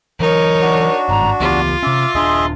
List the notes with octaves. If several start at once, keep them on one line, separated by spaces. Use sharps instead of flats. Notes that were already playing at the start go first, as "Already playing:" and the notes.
E3 F#3 D#4 A#4 C#5
D4 F#4
G1 G#2 A#5
C#2 E3 B3 F4 G4
C3 C#4 E5 D6
D#1 D4 G#4 D#5 E5 C6